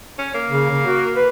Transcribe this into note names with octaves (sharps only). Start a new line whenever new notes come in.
C#4
A#3
C#3
C#3
F#4
B4